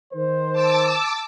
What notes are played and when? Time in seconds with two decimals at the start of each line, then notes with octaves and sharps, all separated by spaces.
0.14 D#3 C5
0.53 A5 D6 E6